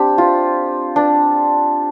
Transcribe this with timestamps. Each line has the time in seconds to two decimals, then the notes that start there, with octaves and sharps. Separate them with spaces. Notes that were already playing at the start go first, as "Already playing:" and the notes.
Already playing: C4 D4 G4
0.18 F4
0.96 D4